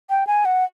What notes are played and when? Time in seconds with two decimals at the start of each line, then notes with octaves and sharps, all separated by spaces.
0.10 G5
0.27 G#5
0.45 F#5